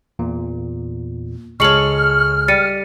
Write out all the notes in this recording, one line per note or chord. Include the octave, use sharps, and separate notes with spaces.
E2 A#2
C#2 G#3 A4 C#5 C#6 F6 C#7 F#7
G3 A6 C#7 D#7